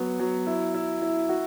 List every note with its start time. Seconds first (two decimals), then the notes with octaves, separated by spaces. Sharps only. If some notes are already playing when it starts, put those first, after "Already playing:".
Already playing: F#3 B3
0.20 F#3
0.47 E4
0.74 E4
1.02 E4
1.29 F#4